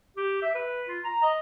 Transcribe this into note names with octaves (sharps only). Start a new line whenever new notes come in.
G4
E5
B4
F4
A#5
D#5